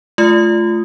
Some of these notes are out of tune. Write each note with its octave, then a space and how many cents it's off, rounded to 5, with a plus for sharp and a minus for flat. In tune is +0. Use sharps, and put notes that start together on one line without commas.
A3 -25 F4 -15 D#6 +0